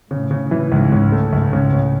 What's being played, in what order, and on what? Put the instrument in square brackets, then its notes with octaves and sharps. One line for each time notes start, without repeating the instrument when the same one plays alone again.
[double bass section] A2 [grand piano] C#3
[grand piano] C#3
E3
[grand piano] C#2 [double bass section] G#2
[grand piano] C#3
A3
[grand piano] C#2 [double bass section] G#2
[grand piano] C#3
[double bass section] A2
[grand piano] C#3